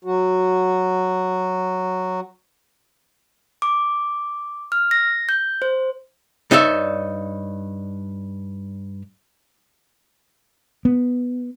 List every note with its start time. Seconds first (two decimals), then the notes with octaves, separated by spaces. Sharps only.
0.05 F#3 F#4
3.62 D6
4.72 F6
4.91 A#6
5.29 G6
5.62 C5
6.51 G2 D#4 C#5 D5 E5
10.85 B3